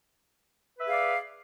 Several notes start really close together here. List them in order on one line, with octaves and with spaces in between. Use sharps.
B4 E5 G#4 F5 D5